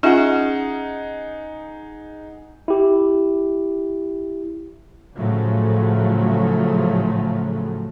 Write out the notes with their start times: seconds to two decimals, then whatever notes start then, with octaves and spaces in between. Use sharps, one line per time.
0.03 C#4 D#4 F4 G#4 E5 F#5
2.68 E4 G4
5.18 A2 C#3 F3 F#3 A3